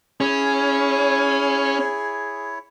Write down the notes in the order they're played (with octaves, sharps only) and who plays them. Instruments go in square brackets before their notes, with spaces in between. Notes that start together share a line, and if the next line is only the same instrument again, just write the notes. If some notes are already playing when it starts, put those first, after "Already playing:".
[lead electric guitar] C#4 [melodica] E4 C#5 [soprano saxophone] G#4